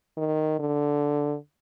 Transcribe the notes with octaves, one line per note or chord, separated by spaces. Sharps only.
D#3
D3